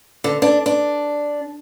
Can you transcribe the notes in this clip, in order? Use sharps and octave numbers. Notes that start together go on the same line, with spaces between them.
D3
D4
D4